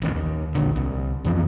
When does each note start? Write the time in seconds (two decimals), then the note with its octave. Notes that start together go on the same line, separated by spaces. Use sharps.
0.02 A1 D#2
0.15 D#2
0.55 A#1 D3
0.76 C2
1.25 F2 E3 F3